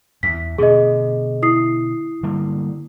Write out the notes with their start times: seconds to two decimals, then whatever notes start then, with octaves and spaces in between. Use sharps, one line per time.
0.23 E2 B6
0.58 B2 D3 G#4 D#5
1.42 E4 D#6 C7
2.23 D3 G3 A#3